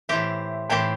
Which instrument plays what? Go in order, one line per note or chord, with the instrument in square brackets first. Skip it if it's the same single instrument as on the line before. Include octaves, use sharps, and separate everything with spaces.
[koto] A2 E3 C4 G4 [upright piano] E5
[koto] A2 E3 C4 G4 [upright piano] G5